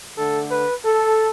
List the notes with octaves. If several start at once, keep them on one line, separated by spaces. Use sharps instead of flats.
D3 A3 A4
B4
A4